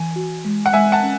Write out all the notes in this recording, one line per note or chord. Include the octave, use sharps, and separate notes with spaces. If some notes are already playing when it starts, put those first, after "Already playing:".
Already playing: E3 G#5
F#4
G#3
F#5
G#3 E5 G#5
F#5 A5
C#4